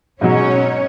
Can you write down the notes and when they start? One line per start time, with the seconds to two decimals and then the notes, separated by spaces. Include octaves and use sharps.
0.21 G#2 B2 F#3 C#4 C#5